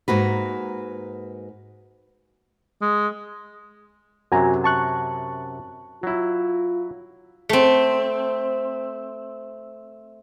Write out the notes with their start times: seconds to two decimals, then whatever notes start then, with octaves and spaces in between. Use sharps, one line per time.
0.08 G#2 A#3 F#4 B4
2.82 G#3
4.32 F#2 C3 F#3 F#4 G#5 A#5
4.64 A5 C#6 F#6
6.03 F#3 E4 F4
7.49 A3 C4